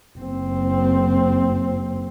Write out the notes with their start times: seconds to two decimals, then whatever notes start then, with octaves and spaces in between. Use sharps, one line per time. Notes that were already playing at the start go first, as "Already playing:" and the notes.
0.18 F#1 C4